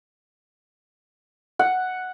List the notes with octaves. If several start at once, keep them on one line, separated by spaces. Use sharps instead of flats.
F#5